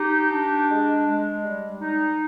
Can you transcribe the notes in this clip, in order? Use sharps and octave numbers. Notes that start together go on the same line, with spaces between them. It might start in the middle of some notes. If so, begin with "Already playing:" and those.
Already playing: D#4 G4
D4
G#3
G#3
G3
D#4